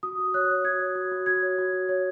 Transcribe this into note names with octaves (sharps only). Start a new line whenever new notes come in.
F#4 D#6
F#4
C#5 F#6
C#5
F#4 G#6
C#5
F#4
F#4
F#4 G#6
C#5
F#4
F#4
C#5